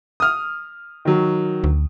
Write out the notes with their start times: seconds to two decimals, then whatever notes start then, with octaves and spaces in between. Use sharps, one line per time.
0.20 D#6 F6
1.05 D#3 F#3
1.64 D2